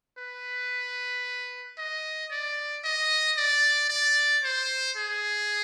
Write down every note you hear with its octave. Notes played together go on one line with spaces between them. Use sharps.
B4
D#5
D5
D#5
D5
D5
C5
G#4